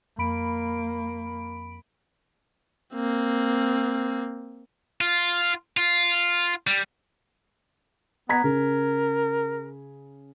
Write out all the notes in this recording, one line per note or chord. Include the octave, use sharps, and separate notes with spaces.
F2 A#3 B5 D7
A#3 C4
F4
F4
G3
B3 A#5 G#6 B6
C#3 A#4